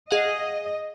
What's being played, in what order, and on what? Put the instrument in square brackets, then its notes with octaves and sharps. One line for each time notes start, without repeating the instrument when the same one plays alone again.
[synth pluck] G#4 F5 F#5 [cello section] D#5